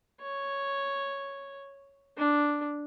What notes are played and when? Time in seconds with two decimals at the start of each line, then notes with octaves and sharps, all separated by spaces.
0.21 C#5
2.17 D4